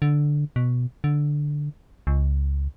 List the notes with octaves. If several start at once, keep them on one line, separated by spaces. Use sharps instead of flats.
D3
B2
D3
C#2